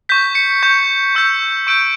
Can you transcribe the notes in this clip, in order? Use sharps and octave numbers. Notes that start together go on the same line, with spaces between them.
C#6 G6 B6
C#7
C#6 G6
C#6 E6 G6
C#6 E6 G6 D7